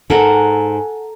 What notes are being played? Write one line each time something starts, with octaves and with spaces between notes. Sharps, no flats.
G#2 A4 A#4 F#5 G#5